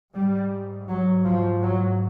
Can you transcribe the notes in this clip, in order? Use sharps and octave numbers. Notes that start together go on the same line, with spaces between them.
G#2 G3
F#3
F3
F#3